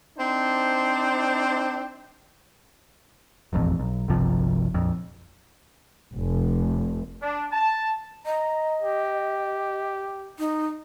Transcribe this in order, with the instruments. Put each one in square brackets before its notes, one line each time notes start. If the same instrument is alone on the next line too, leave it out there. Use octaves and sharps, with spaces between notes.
[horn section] C4 D4 D#4 C5
[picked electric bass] E1 A1 F2
B1
G1 C2 C3 F3
A#1 F2
[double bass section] F1
[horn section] D4
A5
[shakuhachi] D#5 [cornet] A#5
[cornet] G4
[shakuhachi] D#4